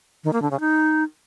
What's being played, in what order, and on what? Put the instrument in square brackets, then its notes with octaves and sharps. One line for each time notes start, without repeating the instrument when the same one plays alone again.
[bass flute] D#3
A#3
D3
C#3
D#4